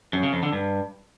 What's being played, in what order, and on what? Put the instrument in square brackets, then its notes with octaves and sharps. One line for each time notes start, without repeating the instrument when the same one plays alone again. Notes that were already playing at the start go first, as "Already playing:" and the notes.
[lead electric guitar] F#2
C#3
F2
D3
G2